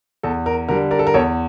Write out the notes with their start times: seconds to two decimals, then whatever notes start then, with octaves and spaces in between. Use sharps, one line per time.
0.23 E2 A4
0.46 A#4
0.68 D3 G3 A#4
0.91 A#4 D5
0.99 A4
1.07 A#4
1.14 E2 A4 C#5